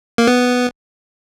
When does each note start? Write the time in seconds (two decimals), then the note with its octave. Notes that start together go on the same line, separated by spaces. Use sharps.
0.18 A#3
0.27 B3